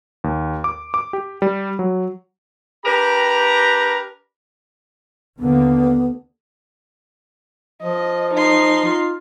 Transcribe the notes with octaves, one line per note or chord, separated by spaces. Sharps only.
D#2
D6
D6
G4
G3
F#3
D4 G4 A#4 B4 A#5
D#2 D3 A#3 B3
F3 D#5
D#4 C6
F4